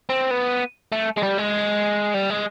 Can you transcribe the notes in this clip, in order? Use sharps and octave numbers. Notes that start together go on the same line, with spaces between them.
C4
B3
A3
G#3
G3
G#3
G3
G#3